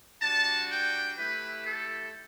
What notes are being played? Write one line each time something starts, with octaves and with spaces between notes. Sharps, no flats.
G3 D4 F#4 A5
G5
A3 E4 G4 B4
A4